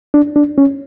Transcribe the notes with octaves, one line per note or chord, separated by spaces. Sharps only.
D4
D4
C#4